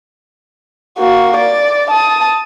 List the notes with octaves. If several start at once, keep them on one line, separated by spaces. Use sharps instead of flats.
A#3 F#4
D5
A5 D#6